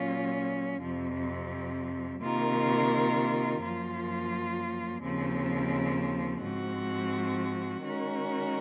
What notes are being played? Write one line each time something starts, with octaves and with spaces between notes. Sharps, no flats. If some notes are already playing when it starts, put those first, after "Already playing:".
Already playing: A#2 F#3 C#4 F4
F2 C3 F3
C3 D#3 A#3 F4 A#4
F#2 F3 A#3 F4
D#2 C#3 F3 C4
G#2 F3 C4 F#4
D#3 G#3 C#4 F#4 A#4